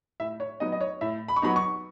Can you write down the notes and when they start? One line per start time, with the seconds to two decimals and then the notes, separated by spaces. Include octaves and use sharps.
0.20 A2 E5
0.40 C#5
0.60 F#3 B3 D#4 D#5
0.72 D#5
0.81 C#5
1.01 A2 E5
1.28 B5
1.36 C#6
1.42 F#3 B3 D#4 B5
1.56 C#6